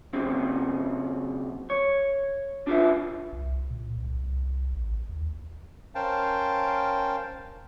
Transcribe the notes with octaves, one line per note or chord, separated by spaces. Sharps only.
F#2 C#3 C4
C#5
D4 F4 B4 E5
C2
A#2
C2
C2
A1
D#2
C#4 A#4 C5 F5 G5 A5